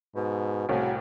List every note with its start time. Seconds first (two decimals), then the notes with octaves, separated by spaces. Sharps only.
0.15 G#2 B2
0.69 C2 A2 C#3 F#4 G#5